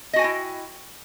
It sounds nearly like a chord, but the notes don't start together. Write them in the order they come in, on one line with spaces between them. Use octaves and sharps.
D#5 F#4 G#5 G5 E4